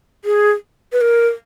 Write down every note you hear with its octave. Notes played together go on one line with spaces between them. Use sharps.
G#4
B4
A#4